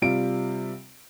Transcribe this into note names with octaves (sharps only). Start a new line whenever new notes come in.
C3 G3 F4 D7